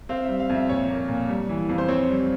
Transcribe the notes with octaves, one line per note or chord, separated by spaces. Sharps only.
C4 F5
G3 E5
F5
F2 E5
A#2 C#5
A#3
A#2
G3
E3
F2
C5
C4 C#5
G3